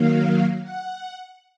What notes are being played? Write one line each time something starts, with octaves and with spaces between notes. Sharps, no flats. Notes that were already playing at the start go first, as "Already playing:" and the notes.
Already playing: D#3 F#3 A#3 F5
F#5